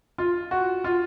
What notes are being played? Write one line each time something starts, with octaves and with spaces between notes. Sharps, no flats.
F4
F#4
F4